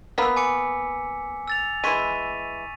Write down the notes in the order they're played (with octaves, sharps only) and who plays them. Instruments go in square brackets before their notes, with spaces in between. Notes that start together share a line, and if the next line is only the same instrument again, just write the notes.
[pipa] A#3 B3 [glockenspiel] E6 B6
[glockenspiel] G#5 D6 C#7
E6 A6 F7
[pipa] E3 G#3 [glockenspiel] C#6 B6 D#7